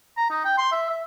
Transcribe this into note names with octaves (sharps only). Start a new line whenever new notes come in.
A#5
D#4
G5
C6
E5
E5